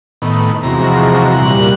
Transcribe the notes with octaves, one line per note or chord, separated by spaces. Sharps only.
A2 D#3 B3
E2 C3 F3 G#3 F#4 A#5
A#2 G3 F#6